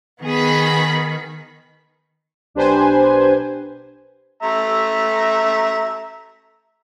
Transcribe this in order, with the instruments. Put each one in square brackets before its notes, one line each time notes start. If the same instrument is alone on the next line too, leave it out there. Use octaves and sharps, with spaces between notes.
[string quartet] D#3 [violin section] B3 G#4 B5
[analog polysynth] B1 D4 G4 B4 C5 G#5
[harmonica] A3 E5 A#5